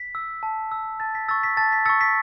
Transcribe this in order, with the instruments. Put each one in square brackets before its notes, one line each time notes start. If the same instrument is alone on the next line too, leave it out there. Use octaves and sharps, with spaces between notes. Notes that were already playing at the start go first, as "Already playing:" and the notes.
Already playing: [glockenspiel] B6
E6
A5
E6
A5 A6
B6
C#6 E6 A6
B6
A5 A6
B6
C#6 E6 A6 C#7
B6